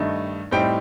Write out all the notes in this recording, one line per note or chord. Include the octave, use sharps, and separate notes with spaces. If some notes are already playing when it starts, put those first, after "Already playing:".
Already playing: G2 D#3 A3 D#4
A2 G3 C4 D#4 G5